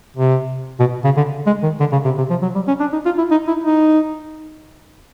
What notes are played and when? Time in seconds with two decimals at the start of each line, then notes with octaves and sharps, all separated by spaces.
0.17 C3
0.80 B2
1.04 C#3
1.17 D3
1.46 G#3
1.63 D#3
1.80 D3
1.92 C#3
2.05 C3
2.18 C3
2.30 F3
2.42 F#3
2.55 G3
2.68 C#4
2.80 D4
2.93 D#4
3.05 F4
3.18 E4
3.31 D#4
3.48 E4
3.64 D#4